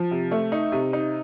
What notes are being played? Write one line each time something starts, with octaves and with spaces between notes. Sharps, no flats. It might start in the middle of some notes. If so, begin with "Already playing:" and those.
Already playing: F3
C3
A3
D#4
C3
D#4